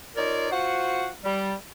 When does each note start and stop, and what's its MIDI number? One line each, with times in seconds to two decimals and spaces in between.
0.16 0.48 63
0.16 0.48 65
0.16 0.48 70
0.16 0.48 73
0.16 0.48 74
0.51 1.09 65
0.51 1.09 66
0.51 1.09 72
0.51 1.09 78
1.24 1.53 55